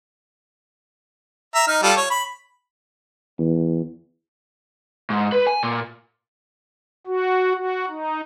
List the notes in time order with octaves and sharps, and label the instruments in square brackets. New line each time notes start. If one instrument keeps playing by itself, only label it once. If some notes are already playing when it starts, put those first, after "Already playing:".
[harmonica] E5 A#5
D#4 F6
G3 F4 A4
C#5
B5
[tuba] E2
[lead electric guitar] G#2
B4
G#5
A#2
[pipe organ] F#4
F#4
D#4